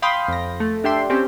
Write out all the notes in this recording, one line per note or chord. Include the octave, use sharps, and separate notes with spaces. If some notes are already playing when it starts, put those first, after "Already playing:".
F5 G5 B5 C6 D#6
F2 A#6
A3
D4 G4 E5 G5 C6
C4 C#4 G4